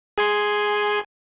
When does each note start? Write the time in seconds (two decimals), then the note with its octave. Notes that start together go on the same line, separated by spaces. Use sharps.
0.18 G#4 G#5 C6